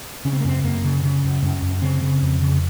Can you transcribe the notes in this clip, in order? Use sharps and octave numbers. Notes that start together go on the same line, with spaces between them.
C#3 C#4
C4
A#3
F#2 C4
F#2 A#3
C#3
C#3
F#2
F#2 C#4
F#2
C#3 C4
C#3
F2
C#3